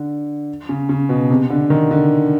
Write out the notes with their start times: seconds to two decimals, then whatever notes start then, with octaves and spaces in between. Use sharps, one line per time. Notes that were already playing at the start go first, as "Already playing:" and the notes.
Already playing: D3
0.69 C#3
0.89 C#3
1.09 B2
1.30 C3
1.50 D3
1.70 D#3
1.91 D3